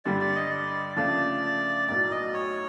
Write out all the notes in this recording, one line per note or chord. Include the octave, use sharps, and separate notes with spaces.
G2 D3 G3 D5
D5
D#5
D5
C#3 F3 A3 D4 D5
B1 A2 F#3 D5
D#5
C#5